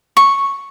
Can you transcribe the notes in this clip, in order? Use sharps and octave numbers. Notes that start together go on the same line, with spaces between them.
C#6